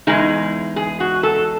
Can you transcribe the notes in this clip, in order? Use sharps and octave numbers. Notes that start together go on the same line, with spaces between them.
E2 C#3 G#3 D#4 G#4
G#4
F#4
A4